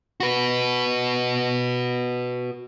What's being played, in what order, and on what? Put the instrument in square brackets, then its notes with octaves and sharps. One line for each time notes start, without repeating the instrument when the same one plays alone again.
[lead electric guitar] F#4 B4